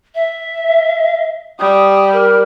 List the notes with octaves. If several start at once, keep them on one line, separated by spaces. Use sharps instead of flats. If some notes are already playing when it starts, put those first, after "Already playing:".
E5
G3 D#6
A#4